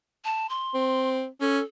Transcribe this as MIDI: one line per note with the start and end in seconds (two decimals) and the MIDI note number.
0.25 0.49 81
0.49 1.11 84
0.74 1.27 60
1.41 1.59 61
1.41 1.63 69